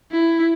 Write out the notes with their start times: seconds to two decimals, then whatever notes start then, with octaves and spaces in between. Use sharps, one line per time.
0.12 E4